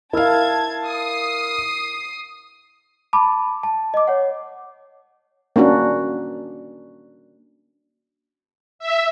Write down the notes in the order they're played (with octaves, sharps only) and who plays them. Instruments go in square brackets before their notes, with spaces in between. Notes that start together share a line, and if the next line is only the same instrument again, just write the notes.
[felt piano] E4 F5 [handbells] A#4 E6 F6 [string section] A5 G#6
[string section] D#6 C7
[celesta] A5 B5 D6
A5
D#5 D6
C#5 F#5
[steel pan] A#3 C#4 D4 F#4
[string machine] E5